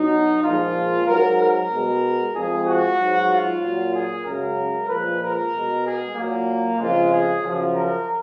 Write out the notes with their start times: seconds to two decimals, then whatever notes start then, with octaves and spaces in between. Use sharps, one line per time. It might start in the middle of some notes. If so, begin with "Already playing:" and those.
Already playing: B2 F#3 D#4
0.43 A#2 F3 G#3 F4
1.07 G#2 F#3 A#4
1.39 A#4
1.71 B2 G#3
2.34 F2 F3 G#3 G#4
2.66 F#4
2.98 G#2 F#3
3.30 F4
3.62 A#2 F#3
3.93 G#4
4.24 F#2 C#3 G#3 A#4
4.89 A#2 F3 G#3 B4
5.21 A#4
5.52 B2 G#3
5.83 G#4
6.15 A#2 F#3 A#3
6.79 F2 C#3 F3 G#3 F4
7.11 G#4
7.43 F#2 C#3 F3
7.75 A#4